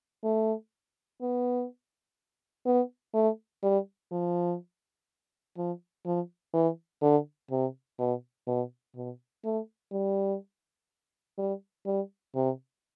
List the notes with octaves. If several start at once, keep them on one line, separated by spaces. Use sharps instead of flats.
A3
B3
B3
A3
G3
F3
F3
F3
E3
D3
C3
B2
B2
B2
A3
G3
G3
G3
C3